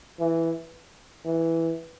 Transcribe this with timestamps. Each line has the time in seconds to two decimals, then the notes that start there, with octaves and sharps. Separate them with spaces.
0.20 E3
1.26 E3